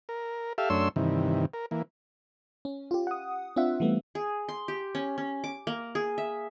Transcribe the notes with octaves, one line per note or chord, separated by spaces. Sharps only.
A#4
G4 A4 E5 F5
F#2 A3 D4 C#5 C6 E6
G2 C3 D#3 E3
A#4
E3 A#3
C#4
F4 G4
F#5 D#6
C4 D4 F4 E5 F#5
E3 G3 A3 B3
G#4
C6
G4
C#4
C#4
D6
A#3
G#4
E5